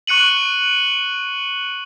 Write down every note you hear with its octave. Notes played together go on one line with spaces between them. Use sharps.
C#6 F#6 C#7 D#7 F#7